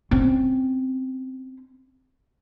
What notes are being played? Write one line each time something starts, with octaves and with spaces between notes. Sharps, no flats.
C4 C#4